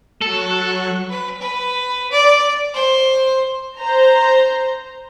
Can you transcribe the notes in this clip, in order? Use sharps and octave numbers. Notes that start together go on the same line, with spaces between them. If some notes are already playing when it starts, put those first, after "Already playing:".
F#3 A4 C#6 F#6
B4
B4
D5
C5
C5 A#5